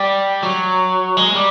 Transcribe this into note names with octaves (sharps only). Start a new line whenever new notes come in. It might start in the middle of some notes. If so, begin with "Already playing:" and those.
Already playing: G3
F#3
G#3
G3